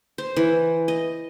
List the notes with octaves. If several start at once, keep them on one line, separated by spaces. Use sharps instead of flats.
C5
E3
D#5